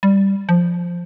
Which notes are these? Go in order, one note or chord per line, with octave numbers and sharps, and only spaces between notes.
G3
F3